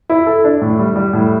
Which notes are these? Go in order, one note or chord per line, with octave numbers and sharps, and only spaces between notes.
E4
A4
D4
A2
G3
G3
A2